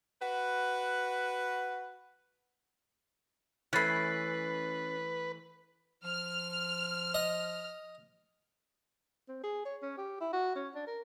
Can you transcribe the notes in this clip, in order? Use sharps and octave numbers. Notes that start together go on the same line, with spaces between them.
F#4 B4
E3 A3 C#4 B4 B5 F#6 A6 C7
F3 F6
D#5
C4
G#4
C#5
C#4
G4
E4
F#4
C#4
D4
A#4